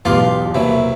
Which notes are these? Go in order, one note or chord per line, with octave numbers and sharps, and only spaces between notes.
B1 E2 F4 G4 B4 C6 D6
C3 E3 F#3 A#3 E4